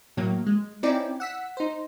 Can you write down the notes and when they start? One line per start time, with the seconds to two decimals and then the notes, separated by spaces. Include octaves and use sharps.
0.17 A2 F#3 A#3
0.46 G#3
0.83 C4 C#4 D#4 E4 D5 G5
1.20 F#5 E6 B6
1.57 D#4 C5